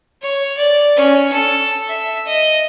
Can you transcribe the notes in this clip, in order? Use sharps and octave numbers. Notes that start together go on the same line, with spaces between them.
C#5
D5
C#4
A4
E5
D#5